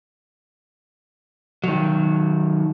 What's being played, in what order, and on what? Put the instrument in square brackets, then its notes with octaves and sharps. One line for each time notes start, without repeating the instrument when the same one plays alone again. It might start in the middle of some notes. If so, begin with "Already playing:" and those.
[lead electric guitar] D#3 F#3